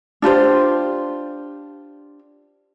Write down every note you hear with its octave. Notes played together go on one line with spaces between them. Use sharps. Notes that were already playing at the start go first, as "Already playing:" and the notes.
D4 F4 G4 C5